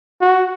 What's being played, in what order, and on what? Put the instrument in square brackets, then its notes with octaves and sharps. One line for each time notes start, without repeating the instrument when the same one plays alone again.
[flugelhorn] F#4